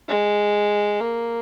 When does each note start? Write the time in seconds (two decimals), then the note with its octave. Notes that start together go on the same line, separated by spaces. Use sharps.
0.08 G#3
1.01 A#3